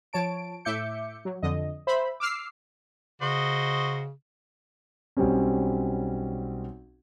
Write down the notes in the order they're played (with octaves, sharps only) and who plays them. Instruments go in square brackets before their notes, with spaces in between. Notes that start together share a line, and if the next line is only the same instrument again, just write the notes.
[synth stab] F3 C#5 A5 D7
A2 E5 D6 G6 C#7
F#3
F2 D3 D#5
C5 E5 B5
D6 E6 F6 C7
[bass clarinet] C#3 [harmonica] F#4 C5 D#5
[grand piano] B1 G3 C4 C#4